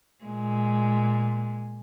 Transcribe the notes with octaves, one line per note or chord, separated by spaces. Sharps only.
A#2 G#3